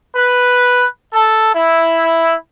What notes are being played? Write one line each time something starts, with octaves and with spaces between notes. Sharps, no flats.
B4
A4
E4